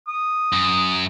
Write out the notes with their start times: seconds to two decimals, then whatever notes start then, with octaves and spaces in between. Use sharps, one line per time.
0.08 D#6
0.53 F#2